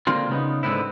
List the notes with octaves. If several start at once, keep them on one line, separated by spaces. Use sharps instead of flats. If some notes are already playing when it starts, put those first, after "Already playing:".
D3 G3 A#3 C4 F4
C#3 B3 D#4
G#2 D3 B3 C4 E4